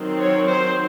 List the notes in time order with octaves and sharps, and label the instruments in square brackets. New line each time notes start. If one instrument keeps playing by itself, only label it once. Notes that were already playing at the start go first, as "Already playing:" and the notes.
Already playing: [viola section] D#3 F#3 C4
C#5
C5